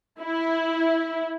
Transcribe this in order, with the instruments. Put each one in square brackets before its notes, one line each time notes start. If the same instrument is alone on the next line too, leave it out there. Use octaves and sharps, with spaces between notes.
[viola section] E4